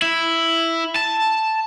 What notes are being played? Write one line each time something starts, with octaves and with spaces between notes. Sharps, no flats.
E4
A5